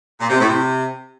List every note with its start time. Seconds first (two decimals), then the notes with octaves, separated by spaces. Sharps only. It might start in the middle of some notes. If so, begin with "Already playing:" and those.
0.20 A#2
0.29 C3
0.39 A2
0.48 C3